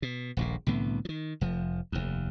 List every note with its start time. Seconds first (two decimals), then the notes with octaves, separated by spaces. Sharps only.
0.02 B2
0.37 D#1 A#1 A#2
0.67 C2 A2 D3 B3
1.05 D#3 F3
1.41 F1 F3
1.92 F1 D#2